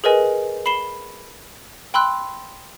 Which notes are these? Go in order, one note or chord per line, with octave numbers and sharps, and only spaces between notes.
G#4 A#4 B4 D#5 G#5
B5 C7 E7 G7
G5 B5 C6 E6 F#6